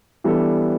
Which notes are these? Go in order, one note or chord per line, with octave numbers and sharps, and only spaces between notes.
E3 G3 B3 D4 A4